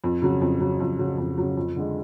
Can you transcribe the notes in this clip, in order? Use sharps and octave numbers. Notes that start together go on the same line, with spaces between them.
F2
C#3 F#3
F2
C#3 F#3
F2
C#3 F#3
F2
C#3 F#3
F2
D3 G#3